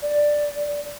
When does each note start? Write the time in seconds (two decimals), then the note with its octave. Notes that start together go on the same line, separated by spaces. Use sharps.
0.02 D5